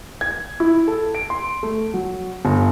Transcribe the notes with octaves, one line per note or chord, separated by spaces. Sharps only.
G#6
E4
A4
D7
C6
A3
F#3
G1